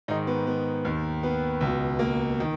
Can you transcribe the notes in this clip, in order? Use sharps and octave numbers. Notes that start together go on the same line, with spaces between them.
G#2 D#3 D#4
B3
B3
D#2 D#3
B3
C#2 B2
A#3
D#3